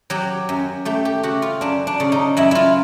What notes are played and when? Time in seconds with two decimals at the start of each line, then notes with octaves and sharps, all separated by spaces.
0.10 F#3 G4
0.49 F#2
0.85 A3 G4
1.05 G4
1.23 C#3 F#4
1.42 F4
1.61 F#2 D4
1.87 D4
2.00 C#3
2.12 D#4
2.37 F#2 E4
2.51 E4 F4